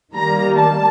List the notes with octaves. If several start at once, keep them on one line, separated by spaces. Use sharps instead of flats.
D#3 G3 A#3 A#5
A5